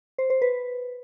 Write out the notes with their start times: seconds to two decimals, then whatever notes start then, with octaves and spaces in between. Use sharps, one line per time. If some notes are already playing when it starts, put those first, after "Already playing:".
0.18 C5
0.30 C5
0.42 B4